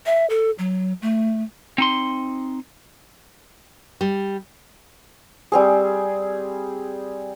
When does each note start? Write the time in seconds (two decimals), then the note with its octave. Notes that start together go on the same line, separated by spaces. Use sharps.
0.06 E5
0.30 A4
0.59 F#3
1.02 A3
1.78 C4 D#4 C6
4.01 G3
5.52 G3 C4 G#4